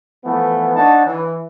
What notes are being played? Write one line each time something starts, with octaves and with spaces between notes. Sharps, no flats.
E3 F3 A3 B3
D4 D#4 C#5 F#5 A5
E3